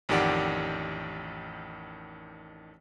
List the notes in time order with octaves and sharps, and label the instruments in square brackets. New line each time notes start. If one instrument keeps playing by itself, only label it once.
[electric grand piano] A1 F2 D#3 G4 D5 F#5